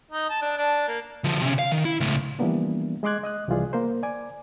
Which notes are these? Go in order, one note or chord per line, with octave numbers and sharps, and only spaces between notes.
D#4
A5
D4
D4
A#3
D3 F3
C3 C#4
F5
D#3
E4
C#2 A2
E3 F3 G3 A#3 B3 D4
G#3 D#5 C6 D6 F#6 G#6
D#5 D#6 F#6
C2 E3 F3 F4 G#4 D5
A#3 A#4 C5
D5 G#5 D6